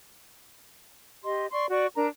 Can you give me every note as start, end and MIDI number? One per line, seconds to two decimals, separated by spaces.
1.24 1.46 67
1.24 1.46 75
1.24 1.46 84
1.52 1.67 74
1.52 1.67 84
1.52 1.67 85
1.69 1.87 66
1.69 1.87 74
1.69 1.87 85
1.95 2.07 62
1.95 2.07 70
1.95 2.07 82